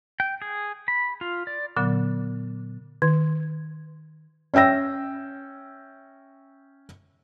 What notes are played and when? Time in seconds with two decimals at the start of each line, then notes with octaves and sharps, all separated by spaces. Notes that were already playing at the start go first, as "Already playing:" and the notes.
0.20 G5
0.42 G#4
0.88 B5
1.21 F4
1.47 D5
1.77 A#2 D3 F#3 B3
3.02 D#3
4.54 C#4 E5 G5 E6 A#6